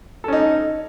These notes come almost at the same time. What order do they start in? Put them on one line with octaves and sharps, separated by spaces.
A4 C#4 D#4